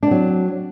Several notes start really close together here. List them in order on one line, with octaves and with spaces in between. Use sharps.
D4 C4 F#3